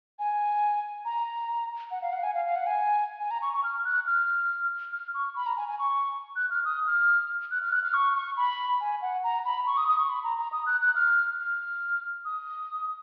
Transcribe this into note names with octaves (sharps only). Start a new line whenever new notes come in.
G#5
A#5
F#5
F5
F#5
G#5
F5
F5
F#5
G#5
G#5
A#5
C#6
C#6
F6
F#6
F6
F6
C#6
B5
A#5
G#5
G#5
C#6
F#6
F6
D#6
F6
F#6
F6
F#6
F6
C#6
C#6
B5
G#5
F#5
A#5
B5
C#6
D#6
D#6
C#6
B5
A#5
A#5
D#6
F#6
F#6
F6
F6
D#6